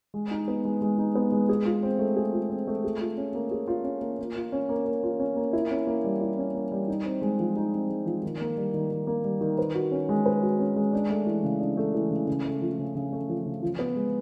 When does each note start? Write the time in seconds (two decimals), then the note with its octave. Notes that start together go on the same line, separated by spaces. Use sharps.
0.14 G#3
0.31 D#4
0.48 B3
0.65 G#3
0.82 G#3
0.98 D#4
1.15 B3
1.32 G#3
1.49 G#4
1.65 F4
1.83 C4
1.99 A3
2.16 G#4
2.33 F4
2.50 C4
2.67 A3
2.84 G#4
3.01 F4
3.17 C#4
3.35 A#3
3.51 G#4
3.68 F4
3.84 C#4
4.01 A#3
4.19 A#3
4.36 F4
4.52 C#4
4.69 A#3
4.85 A#3
5.03 F4
5.19 C#4
5.36 A#3
5.53 E4
5.71 C#4
5.87 A#3
6.04 G3
6.21 E4
6.38 C#4
6.55 A#3
6.72 G3
6.88 D#4
7.05 C4
7.22 G#3
7.39 F3
7.56 D#4
7.73 C4
7.89 G#3
8.06 F3
8.23 D#3
8.41 A#3
8.57 G3
8.74 D#3
8.91 D#3
9.07 A#3
9.24 G3
9.41 D#3
9.58 B4
9.75 F#4
9.91 C#4
10.09 G#3
10.26 B4
10.42 F#4
10.59 C#4
10.76 G#3
10.93 D4
11.10 A3
11.27 E3
11.43 C#3
11.60 D4
11.77 A3
11.94 E3
12.11 C#3
12.27 C#3
12.45 A3
12.61 F3
12.79 C#3
12.95 C#3
13.13 A3
13.29 F3
13.46 C#3
13.63 F3
13.79 B3
13.96 G#3